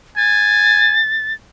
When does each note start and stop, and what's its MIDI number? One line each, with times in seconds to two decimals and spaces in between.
0.17 1.00 80
0.17 1.33 93